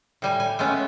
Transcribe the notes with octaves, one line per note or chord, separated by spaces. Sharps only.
A2 G3 G#5
G#5
G#3 A3 B3 C#4